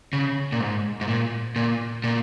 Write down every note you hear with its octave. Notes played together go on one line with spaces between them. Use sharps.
C#3
A#2
G#2
G#2
A#2
A#2
A#2